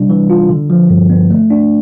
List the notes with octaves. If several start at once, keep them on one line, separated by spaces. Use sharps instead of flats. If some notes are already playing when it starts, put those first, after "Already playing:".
Already playing: C3 G3 D4
E3
F4
D3
F3
G2
B3
A3
D4